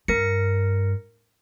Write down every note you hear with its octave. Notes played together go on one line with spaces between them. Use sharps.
G2 A#4 A#6 C#7